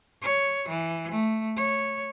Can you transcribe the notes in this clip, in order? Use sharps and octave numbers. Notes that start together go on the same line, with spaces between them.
C#5
E3
A3
C#5